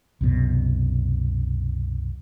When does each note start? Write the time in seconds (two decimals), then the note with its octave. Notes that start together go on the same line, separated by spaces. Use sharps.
0.21 C2 F#2 B2